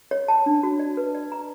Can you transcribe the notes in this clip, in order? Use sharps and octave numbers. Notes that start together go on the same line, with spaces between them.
C#5
A5
D4
F#4
D5
B4
D5
A#5